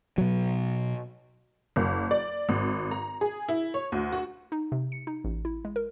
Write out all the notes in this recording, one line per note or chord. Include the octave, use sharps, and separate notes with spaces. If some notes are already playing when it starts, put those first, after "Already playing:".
B2 F#3
F#1
D5
G#1
A#5
G#4
E4
C#5
D2
F#4
D#4
C3
C#7
D#4
A1
E4
G#3
A#4